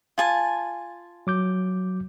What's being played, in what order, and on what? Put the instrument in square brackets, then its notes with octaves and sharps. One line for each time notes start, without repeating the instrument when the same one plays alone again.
[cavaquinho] F4 G#5 A5
[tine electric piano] F#3 D6 G6